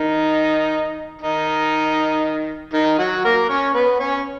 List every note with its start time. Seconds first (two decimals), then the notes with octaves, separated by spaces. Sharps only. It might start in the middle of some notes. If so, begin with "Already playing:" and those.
Already playing: D#3 D#4
1.21 D#3 D#4
2.73 D#3 D#4
2.98 F#3 F#4
3.24 A#3 A#4
3.49 C#4 C#5
3.74 B3 B4
4.00 C#4 C#5